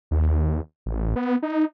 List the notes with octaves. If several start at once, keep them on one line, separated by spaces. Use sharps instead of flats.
D#2
A1
B3
D#4